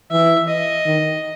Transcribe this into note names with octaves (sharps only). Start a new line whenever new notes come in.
E3 E5
D#5
D#3